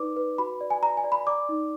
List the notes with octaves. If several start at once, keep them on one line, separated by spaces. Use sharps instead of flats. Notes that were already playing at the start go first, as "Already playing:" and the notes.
Already playing: D#4 B4 D5 D6
B4
F#4 B5
D5
G#5
D5 A#5
G#5
D5
B5
D5 D6
D#4